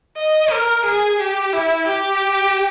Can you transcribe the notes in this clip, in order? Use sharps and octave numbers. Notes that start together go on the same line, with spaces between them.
D#5
A#4
G#4
G4
E4
G4